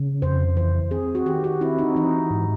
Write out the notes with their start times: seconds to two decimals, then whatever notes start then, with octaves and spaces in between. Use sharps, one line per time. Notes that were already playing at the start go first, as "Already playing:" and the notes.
Already playing: C#3
0.22 F2 C5
0.56 E3 C5
0.91 C4 G#4
1.15 F#4
1.26 D#3 G4
1.44 F#4
1.61 C4 E4
1.79 D#4
1.96 E3 D#4
2.30 G#2